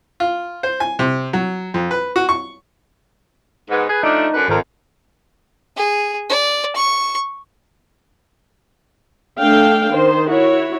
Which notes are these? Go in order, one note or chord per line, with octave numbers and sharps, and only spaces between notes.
F4
C5
G#5
C3
F#3
F2
B4
F#4
C#6
G#2 B3
G#4 B4
F3 A3 D4 D#4
F#2 D3 B4
G#1 F2 A#4
G#4
D5
C#6
A3 D4 A4 F5 G5
D#3 C5
E4 F#4 C#5